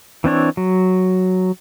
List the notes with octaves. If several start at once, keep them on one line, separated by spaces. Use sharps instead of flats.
E3 C4 D4 C#5
F#3